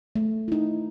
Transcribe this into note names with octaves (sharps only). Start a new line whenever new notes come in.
A3
D#4 E4